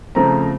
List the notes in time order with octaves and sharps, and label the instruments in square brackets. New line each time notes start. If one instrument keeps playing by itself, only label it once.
[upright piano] C#3 F3 A3 C4 A#5